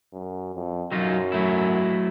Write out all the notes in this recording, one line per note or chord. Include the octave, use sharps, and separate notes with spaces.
F#2
F2
F#2 F#3 D#4 F4
F#3 A3 E4